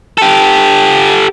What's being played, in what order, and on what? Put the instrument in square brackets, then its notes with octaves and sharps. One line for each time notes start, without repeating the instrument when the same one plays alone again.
[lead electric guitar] G4 A4